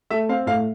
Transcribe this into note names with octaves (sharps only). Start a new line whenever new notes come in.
A3 E5
C4 F5
A2 F5